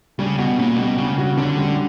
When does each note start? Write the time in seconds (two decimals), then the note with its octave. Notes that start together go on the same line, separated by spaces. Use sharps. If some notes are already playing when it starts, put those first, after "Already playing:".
0.19 C#3 G3
0.38 B2 F#4
0.58 A#2 C#4
0.78 B2 G3
0.98 C#3 G3
1.18 F#4
1.37 D3 C#4
1.57 G3